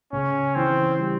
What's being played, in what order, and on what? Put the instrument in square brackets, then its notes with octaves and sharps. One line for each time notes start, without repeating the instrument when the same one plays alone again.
[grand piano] C#3 [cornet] C#4
[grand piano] E3 [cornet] C4
[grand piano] G3